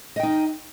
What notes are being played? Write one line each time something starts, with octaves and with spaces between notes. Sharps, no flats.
D#4 D#5 G5